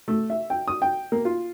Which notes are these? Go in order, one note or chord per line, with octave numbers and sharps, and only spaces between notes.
A3
E5
G5
D#6
G5
A#3
F4